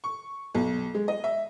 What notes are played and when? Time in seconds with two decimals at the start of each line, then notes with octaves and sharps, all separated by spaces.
0.04 C#6
0.55 B1
0.94 G#3
1.08 D#5
1.24 E5